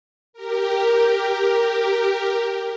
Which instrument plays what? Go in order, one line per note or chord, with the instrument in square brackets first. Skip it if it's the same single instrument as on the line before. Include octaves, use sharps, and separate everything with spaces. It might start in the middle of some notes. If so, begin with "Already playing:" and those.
[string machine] G4 A#4